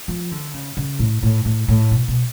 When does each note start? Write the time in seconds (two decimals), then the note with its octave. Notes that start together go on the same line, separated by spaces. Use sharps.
0.08 F3
0.31 D3
0.54 C#3
0.77 C#3
0.99 A2
1.23 A2
1.45 A2
1.68 A2
1.91 B2
2.08 B2